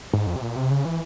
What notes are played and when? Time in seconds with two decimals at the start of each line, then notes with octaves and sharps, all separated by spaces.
0.14 G#2
0.27 F2
0.36 C3
0.42 A#2
0.56 C3
0.71 C#3
0.85 E3